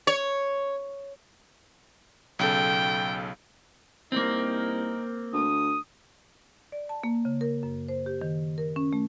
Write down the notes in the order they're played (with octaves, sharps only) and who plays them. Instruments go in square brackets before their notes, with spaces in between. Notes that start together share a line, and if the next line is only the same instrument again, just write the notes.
[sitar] C#5
[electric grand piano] B1 C#3 A4 [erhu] G5
[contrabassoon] C2 [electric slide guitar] A#3 C4 [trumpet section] D#4 A#4
[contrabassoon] D2 [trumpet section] D#6
[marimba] D5
A5
A#3
C#3
A#4
F#2
C5
G4
D#3
A#4
C#4
A3